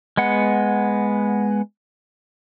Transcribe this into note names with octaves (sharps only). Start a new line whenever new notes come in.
G#3 B3 F#5